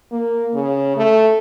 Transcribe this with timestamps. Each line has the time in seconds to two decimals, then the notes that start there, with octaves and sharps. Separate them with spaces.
0.12 A#3
0.54 C#3
0.97 A3